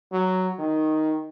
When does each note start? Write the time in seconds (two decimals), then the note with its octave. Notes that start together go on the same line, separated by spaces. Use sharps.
0.12 F#3
0.59 D#3